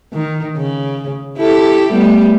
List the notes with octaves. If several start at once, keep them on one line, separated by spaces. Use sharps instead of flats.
D#3
C#3
E4 G4 A4
G3 A3 B3